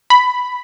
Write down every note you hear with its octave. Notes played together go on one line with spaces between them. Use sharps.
B5